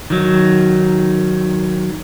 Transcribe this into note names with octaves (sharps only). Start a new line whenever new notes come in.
D#3 F#3